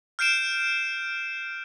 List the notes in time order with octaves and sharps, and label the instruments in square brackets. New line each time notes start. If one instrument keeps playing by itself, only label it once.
[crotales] F6 G6 C7 D7 E7